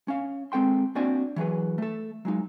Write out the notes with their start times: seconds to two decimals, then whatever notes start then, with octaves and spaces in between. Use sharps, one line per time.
0.08 C#4 F5
0.52 G#3 C4 A4 G5 C6
0.95 A#3 C4 D4 F#4 D5 G#5
1.36 E3 F#3 G#4 B4
1.78 A3 A4
2.25 F#3 G#3 D#4